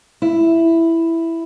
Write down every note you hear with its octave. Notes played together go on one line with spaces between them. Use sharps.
E4